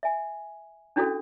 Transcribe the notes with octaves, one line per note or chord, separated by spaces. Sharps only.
E5 G#5
C#4 D4 E4 F#4 G#4 A4